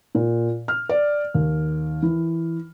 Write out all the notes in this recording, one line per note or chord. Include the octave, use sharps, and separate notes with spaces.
A#2
F6
D5
D#2
E3